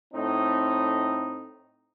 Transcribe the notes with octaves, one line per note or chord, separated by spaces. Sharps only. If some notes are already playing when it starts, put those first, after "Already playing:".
A2 C4 D#4